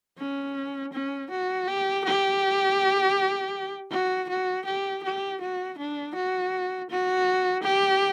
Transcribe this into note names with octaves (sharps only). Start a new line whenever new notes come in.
C#4
C#4
F#4
G4
G4
F#4
F#4
G4
G4
F#4
D4
F#4
F#4
G4